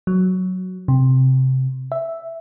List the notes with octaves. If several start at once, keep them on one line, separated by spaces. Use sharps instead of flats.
F#3
C3
E5